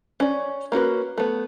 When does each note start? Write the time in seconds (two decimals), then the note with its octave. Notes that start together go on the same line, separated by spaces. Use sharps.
0.20 C#4 D5
0.72 A#3 C#4 F#4 B4
1.18 A3 B3